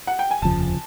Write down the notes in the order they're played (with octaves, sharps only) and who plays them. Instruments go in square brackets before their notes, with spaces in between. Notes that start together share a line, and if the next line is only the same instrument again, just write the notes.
[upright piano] F#5
G5
G#5
[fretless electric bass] F1 D#2 C#3 F3 [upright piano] A5